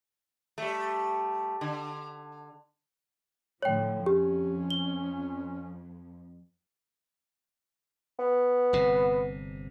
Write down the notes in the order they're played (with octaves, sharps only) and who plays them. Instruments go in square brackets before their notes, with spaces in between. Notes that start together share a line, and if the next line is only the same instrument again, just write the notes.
[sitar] G3 A3
D3
[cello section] A2 D3 F3 [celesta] C#5 G5
[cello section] F2 [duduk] C#4 [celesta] G4
[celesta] G7
[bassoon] B3
[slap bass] G1 C3